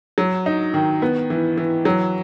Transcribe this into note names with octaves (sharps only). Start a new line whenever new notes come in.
F#3
D#4
D#3
B3
E3
E3
F#3